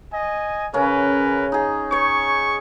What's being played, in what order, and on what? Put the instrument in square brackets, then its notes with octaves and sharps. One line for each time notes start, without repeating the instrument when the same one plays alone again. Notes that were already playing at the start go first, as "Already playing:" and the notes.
[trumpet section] D#5 G#5
[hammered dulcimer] C#3 C#4 [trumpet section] A#4 B4
[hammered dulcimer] D#4 G#4
[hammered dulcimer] C#5 [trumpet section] C#6